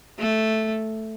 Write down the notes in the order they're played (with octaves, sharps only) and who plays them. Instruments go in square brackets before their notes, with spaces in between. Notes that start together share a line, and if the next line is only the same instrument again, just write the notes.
[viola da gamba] A3